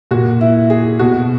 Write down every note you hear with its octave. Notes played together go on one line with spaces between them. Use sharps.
A#2 F#4
E4
G#4
B2 F#4